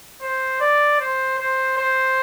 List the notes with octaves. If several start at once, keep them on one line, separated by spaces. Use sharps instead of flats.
C5
D5
C5
C5
C5